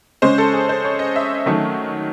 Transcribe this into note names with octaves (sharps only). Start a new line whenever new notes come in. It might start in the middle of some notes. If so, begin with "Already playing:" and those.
C#3 G#3 C#4 C5
A4
G#4
C5
C#5
D#5
E5
D#3 F#3 A3 C#4